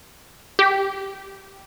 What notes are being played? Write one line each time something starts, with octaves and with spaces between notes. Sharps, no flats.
G4 B6